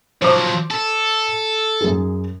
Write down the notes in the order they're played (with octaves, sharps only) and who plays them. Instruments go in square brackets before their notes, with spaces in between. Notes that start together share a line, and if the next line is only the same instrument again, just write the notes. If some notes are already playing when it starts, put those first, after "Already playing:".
[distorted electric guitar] F3 F#3 [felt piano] C5 D6
[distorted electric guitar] A4
[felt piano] F#2 G#4